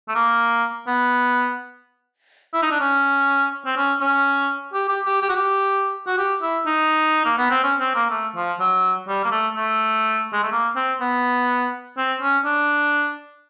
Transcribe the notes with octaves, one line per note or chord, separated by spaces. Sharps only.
A3
A#3
B3
E4
D#4
D4
C#4
C4
C#4
C#4
G4
G4
G4
G4
F#4
G4
F#4
G4
E4
D#4
A#3
B3
C4
C#4
C4
A#3
A3
F3
F#3
G3
A#3
A3
A3
G#3
A3
A#3
C4
B3
C4
C#4
D4